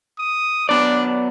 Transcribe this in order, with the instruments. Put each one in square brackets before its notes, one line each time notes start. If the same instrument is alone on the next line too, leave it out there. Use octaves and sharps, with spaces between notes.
[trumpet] D#6
[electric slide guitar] F#3 B3 D5 [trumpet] D4